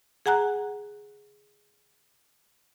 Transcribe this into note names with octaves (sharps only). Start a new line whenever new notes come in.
G#4 F#5 G#5 A#5 F#6